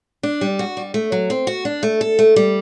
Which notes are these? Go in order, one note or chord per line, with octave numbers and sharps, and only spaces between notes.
D4
G3
F#4
G3
A3
F#3
C4
F#4
D4
A3
A4
A3
G3